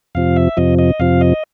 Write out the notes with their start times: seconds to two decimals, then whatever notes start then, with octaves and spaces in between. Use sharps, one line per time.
0.15 F2 C3 F3 F5
0.36 E5
0.57 F2 C3 F3 D#5
0.79 D#5
1.00 F2 C3 F3 F5
1.21 D#5